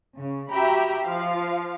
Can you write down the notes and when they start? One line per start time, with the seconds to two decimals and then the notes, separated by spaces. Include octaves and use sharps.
0.17 C#3
0.50 F#4 G4 E5 G5 A#5 B5
1.05 F3 F5